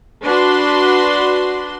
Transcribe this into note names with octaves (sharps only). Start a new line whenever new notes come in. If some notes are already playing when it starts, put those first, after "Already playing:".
D4 F#4 B4 C6